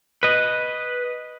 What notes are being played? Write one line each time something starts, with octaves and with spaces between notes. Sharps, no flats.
B4 D#5